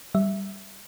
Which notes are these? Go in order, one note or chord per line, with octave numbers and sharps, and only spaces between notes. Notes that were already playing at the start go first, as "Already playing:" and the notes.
G3 E5